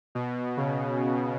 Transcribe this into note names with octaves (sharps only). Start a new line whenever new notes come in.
B2
C#3